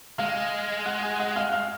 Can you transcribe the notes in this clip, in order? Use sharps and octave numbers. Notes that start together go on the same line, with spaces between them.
G#3 F5 F6
F#5 F#6
G#5 G#6
F#5 F#6
F5 F6
F5 F6